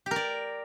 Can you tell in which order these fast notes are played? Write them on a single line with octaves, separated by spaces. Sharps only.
G4 A#4 D5